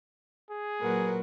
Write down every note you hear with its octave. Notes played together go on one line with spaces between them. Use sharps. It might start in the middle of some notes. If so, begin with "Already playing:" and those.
G#4
A#2 F#3 A#4 B4 F#5